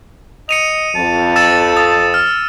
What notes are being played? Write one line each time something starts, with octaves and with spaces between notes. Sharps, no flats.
D#5 C#7 D#7 F7
F2 A5
E6 A6 E7
D#6
F6